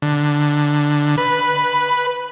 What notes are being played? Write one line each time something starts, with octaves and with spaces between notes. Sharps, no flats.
D3
B4